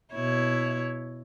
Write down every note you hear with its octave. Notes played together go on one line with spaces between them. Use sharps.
B2 E4 C#5